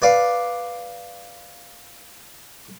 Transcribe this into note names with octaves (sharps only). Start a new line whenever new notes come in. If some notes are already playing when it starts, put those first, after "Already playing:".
B4 D5 F5